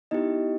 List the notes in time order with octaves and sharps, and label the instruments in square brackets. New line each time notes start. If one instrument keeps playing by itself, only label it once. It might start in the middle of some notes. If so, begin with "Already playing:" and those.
[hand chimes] B3 D#4 E4 G4 D#5